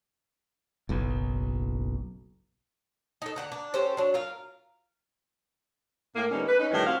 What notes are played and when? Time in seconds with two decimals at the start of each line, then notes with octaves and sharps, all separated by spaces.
0.89 F#1 B1
3.22 D#4 A4
3.36 D3 F#5 A#5
3.52 D4
3.74 C#4 G4 A4 C5
3.97 F#3 D4
4.14 F4 A#4 F5
6.15 A2 A#3
6.31 D3 G3 A#3 B3 C#4 D#4
6.47 B4
6.59 C#4 D#4
6.71 F2 A2 D#3 E3 G3 C#4
6.86 C4 F#4 F5